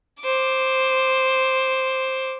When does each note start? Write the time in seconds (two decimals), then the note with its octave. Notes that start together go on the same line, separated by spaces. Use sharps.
0.21 C5 D6